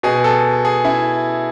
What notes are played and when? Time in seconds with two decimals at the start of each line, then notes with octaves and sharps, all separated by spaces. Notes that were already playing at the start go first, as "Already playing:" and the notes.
0.03 B2 G#4
0.24 A4
0.65 G#4
0.85 E4